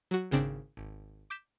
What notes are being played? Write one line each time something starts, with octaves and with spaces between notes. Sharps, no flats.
F#3 F#4
G#1 C#3 C4 D4 D7
G#1
D6 G6 B6 E7